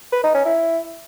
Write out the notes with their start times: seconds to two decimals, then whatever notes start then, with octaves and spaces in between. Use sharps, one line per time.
0.13 B4
0.24 D#4
0.35 C#4
0.46 E4